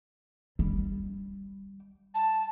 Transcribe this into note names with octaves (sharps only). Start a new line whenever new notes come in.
G3
A5